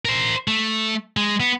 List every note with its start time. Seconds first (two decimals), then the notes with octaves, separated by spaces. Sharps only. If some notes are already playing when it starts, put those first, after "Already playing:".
0.05 A#4 C5
0.48 A3
1.17 G#3
1.40 B3